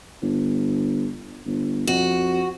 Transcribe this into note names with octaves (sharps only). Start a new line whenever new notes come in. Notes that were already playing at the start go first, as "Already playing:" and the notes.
G1
G1
F2 F#4